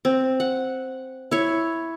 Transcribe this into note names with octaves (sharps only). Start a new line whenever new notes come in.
C4
F#5
E4 C#5